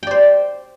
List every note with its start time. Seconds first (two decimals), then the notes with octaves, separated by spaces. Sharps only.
0.03 G5
0.07 D5
0.11 C5